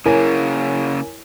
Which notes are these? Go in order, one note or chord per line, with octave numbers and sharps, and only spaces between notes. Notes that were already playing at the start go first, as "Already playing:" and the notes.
C#3 A#3 E4 A#4 C#5 G#5